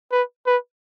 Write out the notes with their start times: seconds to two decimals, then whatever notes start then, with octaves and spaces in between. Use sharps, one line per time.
0.12 B4
0.47 B4